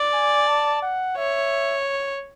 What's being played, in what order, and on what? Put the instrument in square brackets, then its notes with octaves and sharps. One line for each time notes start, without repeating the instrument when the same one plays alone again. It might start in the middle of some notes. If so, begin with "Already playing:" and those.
Already playing: [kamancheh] D5
[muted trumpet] G#5
A5
F#5
[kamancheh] C#5 [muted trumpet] E5